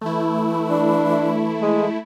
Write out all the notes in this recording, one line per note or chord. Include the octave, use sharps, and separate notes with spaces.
E3 A3 E4
D4
G#3